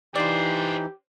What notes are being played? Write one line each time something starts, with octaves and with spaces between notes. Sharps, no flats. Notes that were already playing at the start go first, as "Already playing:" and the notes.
E3 D4 D#4 F4 G4 C5 D5